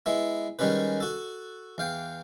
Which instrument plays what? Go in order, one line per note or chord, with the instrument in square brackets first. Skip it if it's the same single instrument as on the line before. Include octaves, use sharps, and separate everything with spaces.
[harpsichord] G#3 B3 E4
D#3 G3 G#3 C#4 B4
F#4 A4
E2 F5 G5